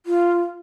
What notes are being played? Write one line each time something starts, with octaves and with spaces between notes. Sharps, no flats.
F4